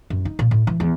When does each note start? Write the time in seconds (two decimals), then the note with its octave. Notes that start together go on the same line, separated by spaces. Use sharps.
0.10 F#2
0.25 D#4
0.39 A#2
0.51 A2
0.67 E3
0.80 E2